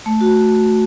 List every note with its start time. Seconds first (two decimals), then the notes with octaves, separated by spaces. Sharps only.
0.06 A3
0.21 F#4